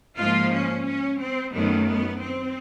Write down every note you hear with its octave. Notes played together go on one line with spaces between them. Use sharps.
G#2 F3 A#3 F4
C#4
C#4
C4
F#2 D#3 F#3 A3 B3
B3
C4